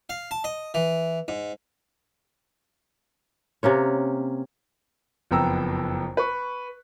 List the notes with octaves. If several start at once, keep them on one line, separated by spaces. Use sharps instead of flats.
F5
A5
D#5
E3
G#2
C3 A#3 C#4 C#5
F#1 F2 B3 G5 A#5 E6
B4 C#6